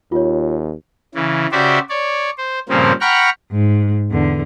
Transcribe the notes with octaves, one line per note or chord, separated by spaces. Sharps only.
D#2 F4 C#5
C#3 E3
C#3 F#4 G4 C5 D5 E5
C#5 D5
C5
G2 A#2 C#3 F3 A#3 C4
F#5 G5 A#5 B5 C#6 F6
G#2
E2 D3